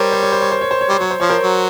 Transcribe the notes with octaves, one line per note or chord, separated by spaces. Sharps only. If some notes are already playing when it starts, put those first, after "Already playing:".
Already playing: G3 A#4 C5 C#5
C5
C#5
C5
C#5
C5
C#5
C5
C#5
G3 C5
F#3 C#5
C5
F3 C#5
A#4 C5
F#3